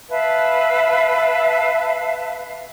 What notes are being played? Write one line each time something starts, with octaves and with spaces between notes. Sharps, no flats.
B4 E5 F5 A5